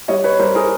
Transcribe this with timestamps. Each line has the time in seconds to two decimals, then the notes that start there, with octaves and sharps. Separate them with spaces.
0.08 G3 C#5 D#5
0.24 B4 C#5
0.39 G3 A#4 C5
0.55 G#4 A#4